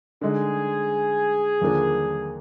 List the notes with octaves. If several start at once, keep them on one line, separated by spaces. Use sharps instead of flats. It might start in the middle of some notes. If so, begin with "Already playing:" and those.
D3 G#3 D#4 G#4
D#2 D3 F3 A#3 D4